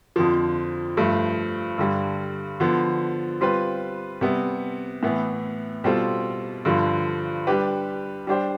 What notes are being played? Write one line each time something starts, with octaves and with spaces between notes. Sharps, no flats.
F2 D3 F3
G2 F3 A3
G2 D3 G3
D3 F3 B3
G3 C4 F4 B4
C3 G3 B3
A2 E3 B3
B2 G3 C4 F4 A4
G2 D3 F3
G3 D4 G4 B4
G3 D4 G4 C5